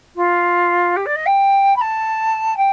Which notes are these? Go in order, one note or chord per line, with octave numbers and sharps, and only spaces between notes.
F4
G4
D5
D#5
G5
B5
A5
G5